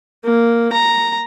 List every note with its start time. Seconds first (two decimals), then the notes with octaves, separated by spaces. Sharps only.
0.24 A#3
0.73 A#5